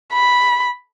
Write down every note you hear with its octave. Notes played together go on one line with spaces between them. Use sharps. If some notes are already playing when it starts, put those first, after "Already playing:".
B5